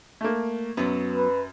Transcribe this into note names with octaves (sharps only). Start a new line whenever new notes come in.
A3 A#3
F#2 F#3 B3
B4